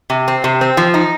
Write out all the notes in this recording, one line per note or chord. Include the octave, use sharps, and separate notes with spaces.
C3
C4
C3
C4
F3
D#4